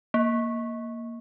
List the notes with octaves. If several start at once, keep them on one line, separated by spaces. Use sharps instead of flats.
A#3